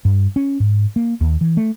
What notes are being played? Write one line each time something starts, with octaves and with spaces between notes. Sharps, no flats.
G2
C#4
G#2
A#3
D#2
E3
A3